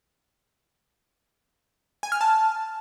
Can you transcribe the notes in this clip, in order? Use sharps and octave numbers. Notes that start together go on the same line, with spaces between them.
G#5
F6
A5